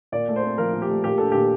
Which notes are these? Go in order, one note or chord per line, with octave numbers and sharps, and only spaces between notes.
A#2 D5
A3
C5
C4
F3 A#4
A#2
G4
A3
A#2 G4
D4 A4
A#2 G4